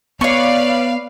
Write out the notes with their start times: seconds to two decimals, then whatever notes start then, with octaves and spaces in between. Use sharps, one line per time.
0.21 B3 B4 C#5 D5 F5 C#6